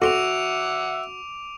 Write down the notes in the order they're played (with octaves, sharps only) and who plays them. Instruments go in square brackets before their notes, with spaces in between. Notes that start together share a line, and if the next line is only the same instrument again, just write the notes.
[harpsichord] F2 C4 [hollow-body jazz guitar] F#4 [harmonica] E5 F#5 [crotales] D6 D7 F7